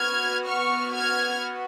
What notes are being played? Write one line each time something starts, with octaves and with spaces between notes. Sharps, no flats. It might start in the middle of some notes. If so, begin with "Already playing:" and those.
Already playing: B3 F#4 F6 G#6
C#6 F6
F6 G#6